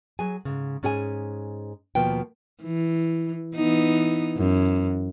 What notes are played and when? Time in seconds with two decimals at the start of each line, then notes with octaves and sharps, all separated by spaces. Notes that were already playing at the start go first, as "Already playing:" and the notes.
0.19 F#3 G#4 G#5
0.45 G#2 C#3
0.83 G#2 C#4 G#4 G5 G#5
1.95 D#2 B2 F3 A#3 B4 G5
2.63 E3
3.55 E3 B3 D#4
4.37 F#2